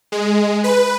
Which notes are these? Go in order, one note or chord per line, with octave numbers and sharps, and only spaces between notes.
G#3
B4